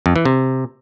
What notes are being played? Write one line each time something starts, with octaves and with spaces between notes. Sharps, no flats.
F2
E3
C3